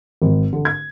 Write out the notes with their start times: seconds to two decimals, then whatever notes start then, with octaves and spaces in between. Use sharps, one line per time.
0.22 G#1
0.53 D3
0.65 G#6